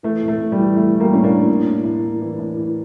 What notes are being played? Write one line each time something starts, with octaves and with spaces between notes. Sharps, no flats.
E3 A3
A2
A3
A2
G3
E3
E3 A3
E3
G3 A#3
A2 C#4
A#3 D4
A2
A2
A2
A2
A2
E3
A2
E3